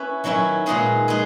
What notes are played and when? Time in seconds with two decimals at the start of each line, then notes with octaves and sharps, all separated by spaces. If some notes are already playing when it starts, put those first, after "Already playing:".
Already playing: C#4 E4 B4
0.24 D#3 F#3 C#4 E4 B4
0.66 A#2 G#3 D#4 G#4 B4
1.08 G#3 D#4 G#4 B4